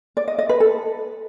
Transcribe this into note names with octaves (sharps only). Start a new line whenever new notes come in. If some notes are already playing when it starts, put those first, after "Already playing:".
D5
D#5
D#5
B4
A4